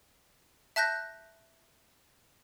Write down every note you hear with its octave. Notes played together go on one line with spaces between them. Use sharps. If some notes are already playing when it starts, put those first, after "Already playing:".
E5 A5 F#6 G6 A#6